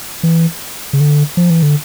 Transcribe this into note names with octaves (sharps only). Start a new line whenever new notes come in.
E3
C#3
D3
F3
E3
D3